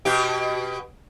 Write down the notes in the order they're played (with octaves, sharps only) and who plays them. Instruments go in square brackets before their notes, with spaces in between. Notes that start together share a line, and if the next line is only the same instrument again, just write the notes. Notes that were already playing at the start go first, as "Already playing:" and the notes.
[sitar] B2 G4